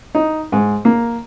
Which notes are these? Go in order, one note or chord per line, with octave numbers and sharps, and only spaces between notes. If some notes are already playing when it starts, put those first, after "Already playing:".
D#4
G#2
A#3